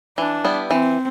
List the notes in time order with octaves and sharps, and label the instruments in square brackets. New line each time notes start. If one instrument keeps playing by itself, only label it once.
[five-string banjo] E3 [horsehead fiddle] D4
[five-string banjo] G3 B3 E4
[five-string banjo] E3 [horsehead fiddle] C4